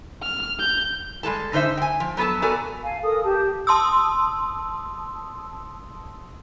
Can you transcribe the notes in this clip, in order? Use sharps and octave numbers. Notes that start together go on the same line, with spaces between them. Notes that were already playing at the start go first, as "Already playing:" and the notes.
F6
G6
G3 G#3 A4 A5
A2 D3 D#4 C5 E5
G5 G#5
F3
F#3 B3 A4 B4 A5
B3 F#4 A4 A#4 D5 G#5
F5 G#5 A5
A4 A#4 D#6
G4 A5
A5 C6 D#6 E6